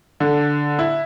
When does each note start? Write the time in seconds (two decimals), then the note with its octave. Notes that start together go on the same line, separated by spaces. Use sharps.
0.20 D3
0.79 E4